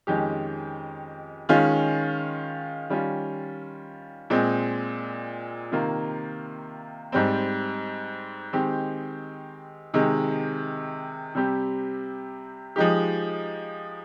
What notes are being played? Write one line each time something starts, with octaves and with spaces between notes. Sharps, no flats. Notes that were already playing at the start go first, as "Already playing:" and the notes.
F2 D#3 G#3 C#4 G4
D#3 G#3 C#4 F4
D#3 G3 C#4 F4
A#2 G#3 C4
C3 D#3 A#3 F4
G#2 G3 C4
D#3 G#3 C4 G4
C3 D#3 G#3
C3 G3 C4 G4
F3 G#3 D#4 G4